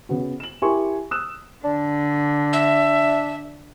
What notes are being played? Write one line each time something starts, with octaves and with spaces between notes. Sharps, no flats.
C#3 B3 F#4
E7 F#7
E4 G4 A#4 G#5 C6 C#6
D#6 E6 F#6 E7
D3 D4
E5